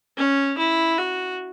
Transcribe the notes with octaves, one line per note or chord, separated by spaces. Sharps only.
C#4
E4
F#4